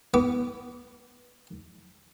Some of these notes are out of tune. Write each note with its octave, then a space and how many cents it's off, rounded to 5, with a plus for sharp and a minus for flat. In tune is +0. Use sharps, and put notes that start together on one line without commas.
B3 +0 D6 -35